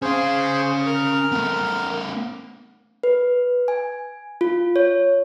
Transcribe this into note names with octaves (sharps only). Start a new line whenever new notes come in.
C#4 G#4 C5 F5
A#4 F6
A3 B3
B4
G#5
F4
C#5